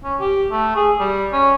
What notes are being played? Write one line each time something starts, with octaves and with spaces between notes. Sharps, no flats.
C#4
G4
A3
G#4
G3
C#4